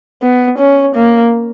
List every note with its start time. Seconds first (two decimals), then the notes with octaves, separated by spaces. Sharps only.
0.22 B3
0.59 C#4
0.96 A#3